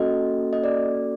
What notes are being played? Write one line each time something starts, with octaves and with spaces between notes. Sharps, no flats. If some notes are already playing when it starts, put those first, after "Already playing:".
Already playing: A#3 C#4 F#4 A4 D#5
D#5
D5